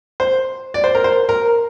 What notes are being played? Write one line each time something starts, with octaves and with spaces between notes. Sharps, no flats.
C5
D5
C5
A#4
C5
A#4